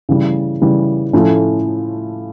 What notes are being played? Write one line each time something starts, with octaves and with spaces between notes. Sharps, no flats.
C#3 E3 G3
C#3 E3 G3
A2 F3 A3 C#4